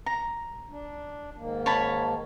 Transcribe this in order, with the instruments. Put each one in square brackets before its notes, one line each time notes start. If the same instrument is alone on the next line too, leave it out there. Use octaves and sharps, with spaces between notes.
[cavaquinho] A#5
[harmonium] D4
G#2 D#3 A#3
[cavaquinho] C#5 A5 B5